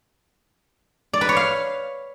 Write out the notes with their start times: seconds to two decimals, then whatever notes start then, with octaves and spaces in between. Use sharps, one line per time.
1.13 D5
1.21 B4
1.29 C#5
1.37 F5